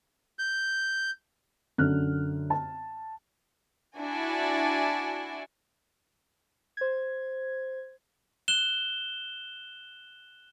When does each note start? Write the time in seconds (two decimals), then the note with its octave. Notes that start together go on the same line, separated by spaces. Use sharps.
0.39 G6
1.78 F#2 D3 F6 F#6
2.50 A5
3.96 D4 E4 F#4 G#5
6.77 C5 G#6
8.48 F#6 E7 G7